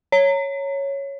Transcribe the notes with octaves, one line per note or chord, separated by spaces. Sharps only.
C#5